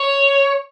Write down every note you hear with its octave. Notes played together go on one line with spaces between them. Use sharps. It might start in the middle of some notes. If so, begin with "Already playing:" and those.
Already playing: C#5